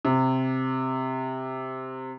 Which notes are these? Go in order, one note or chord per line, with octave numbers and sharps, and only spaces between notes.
C3